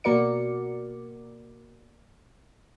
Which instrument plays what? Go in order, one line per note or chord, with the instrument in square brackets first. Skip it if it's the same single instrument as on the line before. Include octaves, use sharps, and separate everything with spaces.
[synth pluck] B2 A#3 F#4 A#4 D5 C#7